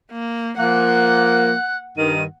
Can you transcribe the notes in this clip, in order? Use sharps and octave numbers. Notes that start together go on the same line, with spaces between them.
A#3
F3 A#3 F#5 F#6
G2 D#3 D#7